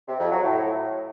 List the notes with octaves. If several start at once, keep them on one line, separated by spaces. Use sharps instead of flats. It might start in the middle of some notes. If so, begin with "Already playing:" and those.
C3
F2
F#3
A2